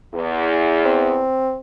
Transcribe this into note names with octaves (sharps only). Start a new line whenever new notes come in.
E2
C4